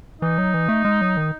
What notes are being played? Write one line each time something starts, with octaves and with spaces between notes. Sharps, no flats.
E3 D#4
F#3
E3
A3
G#3
F#3
D#3